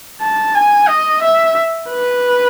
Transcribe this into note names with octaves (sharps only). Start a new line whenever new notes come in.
A5
G#5
D#5
E5
B4